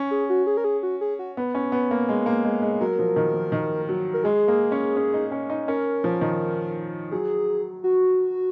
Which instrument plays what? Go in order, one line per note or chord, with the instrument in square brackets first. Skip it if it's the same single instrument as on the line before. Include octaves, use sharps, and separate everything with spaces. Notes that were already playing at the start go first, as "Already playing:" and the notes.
Already playing: [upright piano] C#4
[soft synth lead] G#4
F#4
G#4
A#4
G#4
F#4
G#4
F#4
[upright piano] B3
C#4
B3
A#3
G#3
A#3
G#3
G#3
[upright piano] F#3 [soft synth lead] A#4
[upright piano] F3
D#3
F3
D#3
F#3
[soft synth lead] A#4
[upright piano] G#3 [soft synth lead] G#4
[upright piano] A#3
C#4
C#4
D#4
C#4
D#4
[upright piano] C#4 [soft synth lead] A#4
[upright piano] F3
D#3
[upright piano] F#3 [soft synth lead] G#4
[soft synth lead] F#4